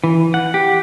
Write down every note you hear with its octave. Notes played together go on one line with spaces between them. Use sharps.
E3
F#5
G4